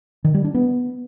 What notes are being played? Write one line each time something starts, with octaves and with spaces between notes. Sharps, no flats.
D#3
G3
D4
B3